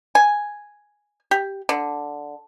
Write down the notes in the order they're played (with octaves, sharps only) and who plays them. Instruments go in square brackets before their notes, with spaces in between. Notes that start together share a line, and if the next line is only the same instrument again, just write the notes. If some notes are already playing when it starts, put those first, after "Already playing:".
[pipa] G#5
G4
D3